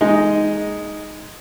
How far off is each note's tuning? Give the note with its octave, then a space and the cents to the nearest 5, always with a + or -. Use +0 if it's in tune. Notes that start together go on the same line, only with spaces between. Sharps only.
G#3 +0 D#4 +0